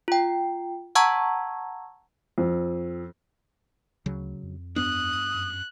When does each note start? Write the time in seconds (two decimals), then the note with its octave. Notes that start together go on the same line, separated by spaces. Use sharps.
0.08 F4 G5
0.95 F#5 A5 A#5 C#6 E6 G#6
2.38 F2
4.06 D2 C#3 F#3
4.43 F2
4.76 G2 B3 D4 D#6 F#6
5.34 F#2